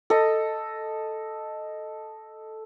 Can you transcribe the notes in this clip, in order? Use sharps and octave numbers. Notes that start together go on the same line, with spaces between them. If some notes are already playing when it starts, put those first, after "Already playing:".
A4 D#5